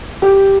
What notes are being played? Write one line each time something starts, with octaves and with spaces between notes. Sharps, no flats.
G4